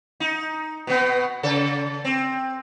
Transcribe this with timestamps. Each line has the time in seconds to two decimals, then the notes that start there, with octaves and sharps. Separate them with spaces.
0.20 D#4
0.87 B2 B3
1.43 C#3 A4
2.05 C4